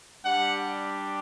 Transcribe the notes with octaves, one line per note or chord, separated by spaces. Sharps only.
G3 D4 G4 F#5